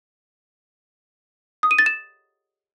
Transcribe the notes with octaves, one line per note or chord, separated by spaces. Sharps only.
D#6
D#7
A6
E7